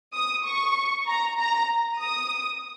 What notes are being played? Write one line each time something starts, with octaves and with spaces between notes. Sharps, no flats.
D#6
C#6
A#5
A#5
D#6